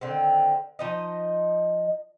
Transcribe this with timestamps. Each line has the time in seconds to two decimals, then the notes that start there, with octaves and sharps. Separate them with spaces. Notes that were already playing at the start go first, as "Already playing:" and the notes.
0.01 D3 D#3 C4
0.79 F3 D#4 D#5